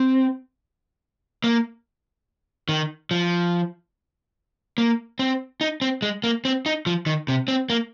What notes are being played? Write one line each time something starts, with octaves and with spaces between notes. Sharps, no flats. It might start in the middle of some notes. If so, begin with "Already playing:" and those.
Already playing: C4
A#3
D#3
F3
A#3
C4
D#4
C4
G#3
A#3
C4
D#4
F3
D#3
C3
C4
A#3